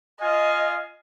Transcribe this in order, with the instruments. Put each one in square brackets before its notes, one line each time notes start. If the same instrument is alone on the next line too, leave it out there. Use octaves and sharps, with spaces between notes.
[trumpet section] F4 F5 G#5 [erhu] D#5